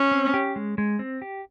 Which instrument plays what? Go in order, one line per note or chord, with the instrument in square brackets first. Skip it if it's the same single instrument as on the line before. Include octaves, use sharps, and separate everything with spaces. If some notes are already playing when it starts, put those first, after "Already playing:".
Already playing: [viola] C#4
[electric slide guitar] C4
G4
G#3
G#3
C4
G4